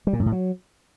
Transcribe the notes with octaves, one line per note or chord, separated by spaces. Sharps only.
G3
A#2
F#2
A2
F#3